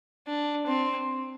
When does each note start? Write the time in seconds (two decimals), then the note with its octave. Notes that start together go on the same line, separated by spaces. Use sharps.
0.27 D4
0.67 C4